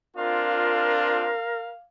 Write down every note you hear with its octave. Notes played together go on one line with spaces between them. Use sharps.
C4 D4 F4 A#4 F5